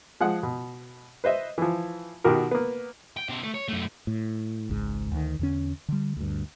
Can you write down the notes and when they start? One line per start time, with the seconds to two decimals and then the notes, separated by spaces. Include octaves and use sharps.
0.21 F3 G#3 F#5
0.43 B2
1.24 B4 C5 D#5 E5
1.58 E3 F3
2.24 B2 D#3 F#4 G4 A#4
2.51 A#3 B3
3.17 G5
3.29 B2 C5
3.43 A3
3.54 C#5
3.68 F#2 A3
4.07 A2
4.69 G#1 C#2 G#2
5.12 D2 D#3
5.39 E2 D3 C#4
5.88 D3 G3
6.17 D2 G2